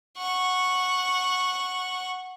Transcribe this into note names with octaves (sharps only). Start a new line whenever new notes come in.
F#5 C#6